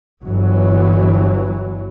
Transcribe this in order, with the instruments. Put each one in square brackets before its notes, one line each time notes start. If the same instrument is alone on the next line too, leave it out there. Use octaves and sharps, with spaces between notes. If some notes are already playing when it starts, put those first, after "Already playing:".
[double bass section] G1 E3 F#3